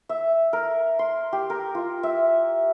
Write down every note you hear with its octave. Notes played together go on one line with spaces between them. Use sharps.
E5
A#4
C6
G4
A#4
F4
E5